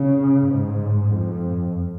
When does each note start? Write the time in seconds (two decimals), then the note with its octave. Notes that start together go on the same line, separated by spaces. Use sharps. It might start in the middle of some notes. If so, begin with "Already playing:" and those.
Already playing: C#3
0.46 G#2
1.12 F2